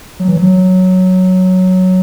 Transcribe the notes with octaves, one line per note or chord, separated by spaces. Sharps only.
F#3
E3
F#3